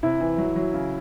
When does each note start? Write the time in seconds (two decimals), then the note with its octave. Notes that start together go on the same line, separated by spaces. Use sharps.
0.03 C3 E4
0.20 E3
0.38 F#3
0.56 F#3
0.73 C#3